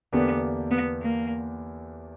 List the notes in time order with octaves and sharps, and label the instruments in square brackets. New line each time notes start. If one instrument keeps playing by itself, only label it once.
[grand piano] E2 D3 A#3 D4 G4 [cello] B3
[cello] B3
A#3